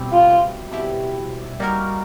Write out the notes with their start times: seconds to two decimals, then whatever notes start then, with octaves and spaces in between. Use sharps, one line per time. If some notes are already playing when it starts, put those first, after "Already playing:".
Already playing: B2 G3 C4 E4 G4
0.12 F4
0.71 B2 G3 C4 E4 G4
1.60 G3 A#3 D#4 F#4 A#4